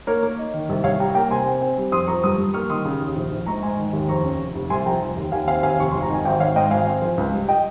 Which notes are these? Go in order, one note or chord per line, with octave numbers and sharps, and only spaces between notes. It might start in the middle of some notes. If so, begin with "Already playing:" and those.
A#3 A#4 C#5
A#3
D#4
D#3
C2
C2 C#5 F5
G3 G5 A#5
A#3 G5 A#5
C3 G#5 C6
C4
C4
G3
F2 C6 D#6
F3 A#5 C#6
G2 C6 D#6
G2
A#3 C#6 F6
D#3 C6 D#6
C#3
D#2
A#1
A#1
G#2 A#5 C#6
G#2 G#5 C6
D#3
D#2
F2 A#5 C#6
C#4
F1
F1
C2 G#5 C6
F3 G5 A#5
F1
D#2
D#2 F5 G#5
C4 F5 G#5
D#2 F5 G#5
F1 C#6
G#1 C6
A#5
D#3 G#5
G#1 D#5 G5
G#1 C#5 F5
G#2 D#5 G5
G#1 F5 G#5
C4
F3
C#2
G3
D#5 G5